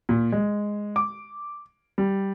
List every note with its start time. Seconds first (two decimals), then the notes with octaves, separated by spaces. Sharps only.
0.09 A#2
0.32 G#3
0.96 D6
1.98 G3